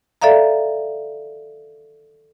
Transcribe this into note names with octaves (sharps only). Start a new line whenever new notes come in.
A4 D5 E5 F5 A#5